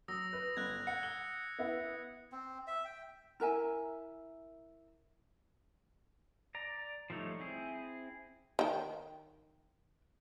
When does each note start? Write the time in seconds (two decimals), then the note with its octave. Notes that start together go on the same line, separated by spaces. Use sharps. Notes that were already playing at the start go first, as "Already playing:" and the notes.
0.08 F#3 D#6 E6 A#6
0.33 B4
0.57 G1 F#6 G#6
0.87 F#5 C#7
1.03 G7
1.59 B3 E4 F#5
2.32 C4
2.67 E5
2.85 G5
3.40 E4 A#4 E5 G#5
6.55 D5 A#5
7.10 F3 G3 A3 D#4 C#5
7.40 C4 E4 G#4
8.59 D#3 G5